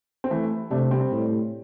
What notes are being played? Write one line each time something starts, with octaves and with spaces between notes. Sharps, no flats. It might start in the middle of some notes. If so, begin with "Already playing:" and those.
C4
E3 A3
C3 A3 D4
G3 C4
A2